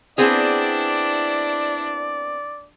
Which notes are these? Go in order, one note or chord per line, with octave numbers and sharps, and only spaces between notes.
B3 C4 D4 E4 G#4 D5